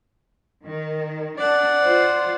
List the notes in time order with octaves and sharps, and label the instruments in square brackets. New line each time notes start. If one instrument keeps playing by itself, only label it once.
[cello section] D#3
[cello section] D4 [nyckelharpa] D5 F#5
[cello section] F4 C5